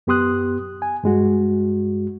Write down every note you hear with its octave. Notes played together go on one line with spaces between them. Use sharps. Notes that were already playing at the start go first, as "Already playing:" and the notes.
F#2 B3 G4 C6 D#6 F#6
G#5
G2 G#3 F#4